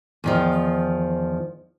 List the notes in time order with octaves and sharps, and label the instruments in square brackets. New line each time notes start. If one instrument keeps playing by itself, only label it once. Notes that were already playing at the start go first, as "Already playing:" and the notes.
[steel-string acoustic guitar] E2 D#3 F3